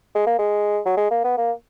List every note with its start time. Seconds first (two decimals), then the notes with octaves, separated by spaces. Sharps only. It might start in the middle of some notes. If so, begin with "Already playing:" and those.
0.15 G#3
0.26 A#3
0.39 G#3
0.85 F#3
0.97 G#3
1.11 A#3
1.24 B3
1.37 A#3